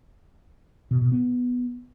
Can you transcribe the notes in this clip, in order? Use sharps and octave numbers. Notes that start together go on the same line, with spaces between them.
B2
B2
B3